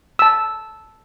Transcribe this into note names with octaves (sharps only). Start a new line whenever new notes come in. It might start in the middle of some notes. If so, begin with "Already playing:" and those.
A5 E6